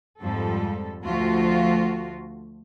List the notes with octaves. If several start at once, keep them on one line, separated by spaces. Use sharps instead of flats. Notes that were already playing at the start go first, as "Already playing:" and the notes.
F2 G#2 F3 G3 A4
D2 F3 A3 F4 F#4